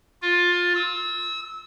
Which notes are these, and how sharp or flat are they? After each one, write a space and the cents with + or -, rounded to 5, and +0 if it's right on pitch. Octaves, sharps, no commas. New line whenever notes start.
F4 +15
E6 -30